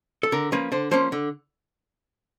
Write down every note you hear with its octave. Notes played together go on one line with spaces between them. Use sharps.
A4
D3 A#4
F3 A#3 C#4 B4
D3 C5
F3 A#3 C#4 C5
D3